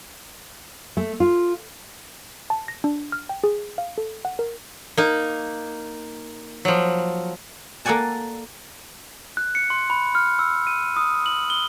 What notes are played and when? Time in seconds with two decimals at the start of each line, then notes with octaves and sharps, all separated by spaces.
0.97 A3
1.20 F4
2.50 A5
2.68 A#6
2.84 D4
3.12 F6
3.29 G5
3.44 G#4
3.78 F5
3.98 A4
4.25 F#5
4.39 A#4
4.97 A#3 D#4
6.65 F3 F#3
7.85 A#3 A4 D5 F#5 G#5 A5
9.37 F#6
9.55 C#7
9.70 C6
9.90 B5
10.15 F6
10.39 E6
10.67 D#7
10.97 D#6
11.26 F#7
11.50 G7